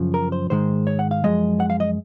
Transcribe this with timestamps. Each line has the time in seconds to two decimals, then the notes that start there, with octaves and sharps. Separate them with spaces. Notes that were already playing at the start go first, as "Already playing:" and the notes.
Already playing: F#2 C#3 F3
0.14 A#4
0.32 C5
0.50 G#2 D#3 G#3 C5
0.87 C#5
0.99 F#5
1.11 F5
1.24 F#2 F3 G#3 D#5
1.60 F#5
1.70 F5
1.80 D#5